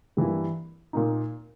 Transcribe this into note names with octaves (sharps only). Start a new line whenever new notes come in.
G2 E3 A#3 E4
A#2 A#3 D#4